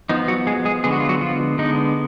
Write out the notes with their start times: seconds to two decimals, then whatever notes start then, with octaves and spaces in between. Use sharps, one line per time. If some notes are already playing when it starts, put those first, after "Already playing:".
0.09 F3 B3 D#4
0.28 F#3 F#4
0.47 G#3 G#4
0.65 G#3 G#4
0.84 D3 G#3 B3 G#4
0.92 F#4
1.00 F4
1.09 F#3 F#4
1.21 F3 F4
1.58 D3 G#3 B3 D#4